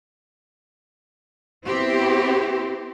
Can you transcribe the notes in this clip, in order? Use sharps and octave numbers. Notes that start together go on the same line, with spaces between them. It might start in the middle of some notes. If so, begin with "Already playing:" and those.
B3 C4 E4 G4 C5